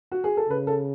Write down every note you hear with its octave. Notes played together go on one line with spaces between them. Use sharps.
F#4
G#4
A4
C#3 B4
A4